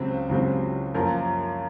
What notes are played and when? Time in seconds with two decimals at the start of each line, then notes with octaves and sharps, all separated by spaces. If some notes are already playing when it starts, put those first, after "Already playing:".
Already playing: C#2 C#3 F#3 C4
0.29 C#2 C#3 F#3 C4
0.94 F#2 F3 A#3 F4 A#4